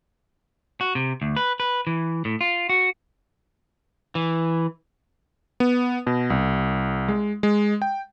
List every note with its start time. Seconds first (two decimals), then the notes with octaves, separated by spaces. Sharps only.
0.81 F#4
0.95 C3
1.22 D2
1.37 B4
1.60 B4
1.87 E3
2.25 A2
2.41 F4
2.69 F#4
4.15 E3
5.60 B3
6.07 B2
6.30 C2
7.08 G#3
7.43 G#3
7.82 G5